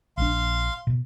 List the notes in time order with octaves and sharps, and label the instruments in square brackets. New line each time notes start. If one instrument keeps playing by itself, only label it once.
[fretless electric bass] A#1 E3 D4 [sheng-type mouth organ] F5 C6
[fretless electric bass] B2